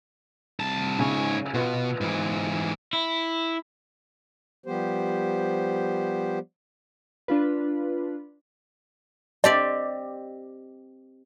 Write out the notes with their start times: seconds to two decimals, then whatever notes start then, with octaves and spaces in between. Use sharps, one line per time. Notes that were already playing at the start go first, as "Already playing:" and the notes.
0.60 C2 A5
0.99 G#2 C#3 C#5 G#5
1.54 B2 B3 F4
2.01 G#2 E3
2.93 E4
4.66 F3 G3 B3 G4 C5
7.28 D4 F4 B4
9.44 C4 G4 D5 D#5